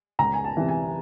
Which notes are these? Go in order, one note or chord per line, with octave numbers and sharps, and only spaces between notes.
C#2 A#5
G#5
A5
C3 E3
G#5